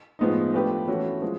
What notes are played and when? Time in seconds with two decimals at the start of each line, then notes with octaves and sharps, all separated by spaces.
0.19 A2 F3 G#3 B3 D#4
0.54 F3 A3 D4 G4 B4
0.87 E3 A3 C#4 F#4
1.22 F3 G#3